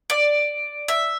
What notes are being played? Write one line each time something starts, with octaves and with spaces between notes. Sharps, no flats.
D5
E5